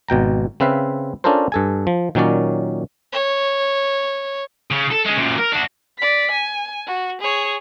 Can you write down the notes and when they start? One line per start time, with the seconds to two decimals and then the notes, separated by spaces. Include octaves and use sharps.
0.08 G#1 B2 G5 A#5
0.60 C#3 C4 B4 E5 F5
1.24 C#4 D4 F4 A4 A#4 C5
1.52 G2 A4 G#5
1.87 F3
2.15 A#2 D#3 F#3 C#4 D5
3.12 C#5
4.70 C#3
4.91 A4
5.05 G#3 C#4
5.18 F#2 A#2
5.38 A#4
5.52 D4 F#4
5.98 D5 B6
6.31 G#5
6.87 F#4
7.21 G#4 C#5